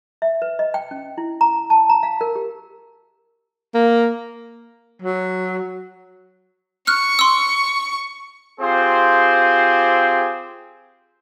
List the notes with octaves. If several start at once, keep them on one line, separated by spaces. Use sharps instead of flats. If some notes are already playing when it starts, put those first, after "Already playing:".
E5
B4
D#5
G5
C#4
E4
A#5
A5
A#5
F5
A#4
G4
A#3
F#3
C#6 F6 F#6
C6 E6
C4 F4 G4 G#4 C5